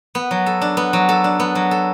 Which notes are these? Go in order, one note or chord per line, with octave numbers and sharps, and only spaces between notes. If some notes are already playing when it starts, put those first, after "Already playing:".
B3
F#3
A4
D4
B3
F#3
A4
D4
B3
F#3
A4